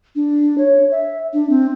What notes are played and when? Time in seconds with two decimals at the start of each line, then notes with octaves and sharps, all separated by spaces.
0.16 D4
0.58 C#5
0.91 E5
1.33 D4
1.50 C4